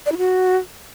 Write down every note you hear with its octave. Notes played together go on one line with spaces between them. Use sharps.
D5
E4
F#4